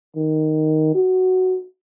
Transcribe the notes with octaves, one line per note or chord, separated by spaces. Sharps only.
D#3
F#4